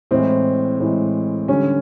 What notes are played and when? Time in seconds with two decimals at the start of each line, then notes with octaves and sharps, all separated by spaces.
0.11 A2 E3 G#3 C4
0.80 A2 E3 G#3
1.48 D3 G3 C#4